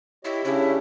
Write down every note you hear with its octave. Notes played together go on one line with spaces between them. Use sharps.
E4 G4 C#5 D#5
C#3 C#4 D4 E4 G4